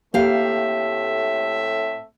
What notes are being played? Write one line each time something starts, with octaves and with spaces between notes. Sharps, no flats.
A2 A3 A#3 C4 G4 E5 F5